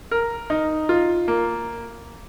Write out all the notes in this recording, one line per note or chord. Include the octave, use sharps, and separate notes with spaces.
A#4
D#4
F4
A#3